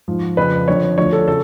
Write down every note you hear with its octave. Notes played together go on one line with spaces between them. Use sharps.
G#2 F3
F2 C#3 F3 B4
F2 D3 F3 C#5
D2 D3 F3 C#5
A4
C#3 A4